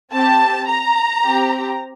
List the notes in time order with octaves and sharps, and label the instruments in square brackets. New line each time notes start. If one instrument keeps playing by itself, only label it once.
[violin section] C4 G4 A5
A#5
C4 G4